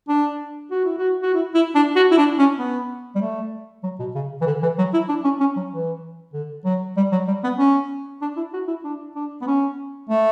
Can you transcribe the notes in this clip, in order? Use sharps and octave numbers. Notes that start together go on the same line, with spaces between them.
D4
F#4
E4
F#4
F#4
E4
E4
D4
F#4
E4
D4
C#4
B3
G3
A3
F#3
B2
C#3
E3
D3
E3
F#3
E4
D4
C#4
C#4
F#3
E3
D3
F#3
G3
F#3
G3
B3
C#4
D4
E4
F#4
E4
D4
D4
B3
C#4
A3